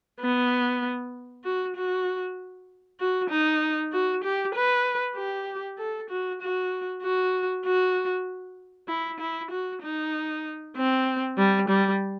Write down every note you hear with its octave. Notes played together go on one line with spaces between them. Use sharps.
B3
F#4
F#4
F#4
D#4
F#4
G4
B4
G4
A4
F#4
F#4
F#4
F#4
E4
E4
F#4
D#4
C4
G3
G3